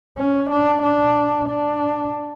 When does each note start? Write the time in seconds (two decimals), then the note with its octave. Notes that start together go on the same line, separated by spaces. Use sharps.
0.18 C#4
0.50 D4
0.83 D4
1.49 D4